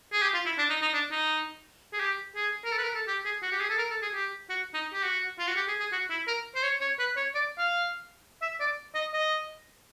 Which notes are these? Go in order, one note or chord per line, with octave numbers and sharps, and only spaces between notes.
G#4
G4
F4
E4
D4
D#4
D#4
D4
D#4
G#4
G4
G#4
A#4
A4
B4
A#4
A4
G4
G#4
F#4
G4
G#4
A4
A#4
A4
G#4
G4
F#4
D#4
G4
F#4
F4
F#4
G4
G#4
G#4
F#4
E4
A#4
C5
C#5
C#5
B4
C#5
D5
F5
E5
D5
D#5
D#5